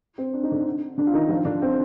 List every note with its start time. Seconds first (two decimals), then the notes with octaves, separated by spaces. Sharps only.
0.18 C4
0.33 D4
0.43 D#4
0.52 D3 D4
0.98 D3 D4
1.07 F4
1.14 D#3 D#4
1.29 F3 F4
1.45 D3 D4
1.62 C4